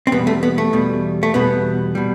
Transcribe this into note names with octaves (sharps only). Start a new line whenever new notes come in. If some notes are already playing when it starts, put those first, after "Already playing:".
C4
E2 B2 G3 B3
A3
B3
A3
E2 B2 G3
A3
E2 B2 G3 B3
B2 G3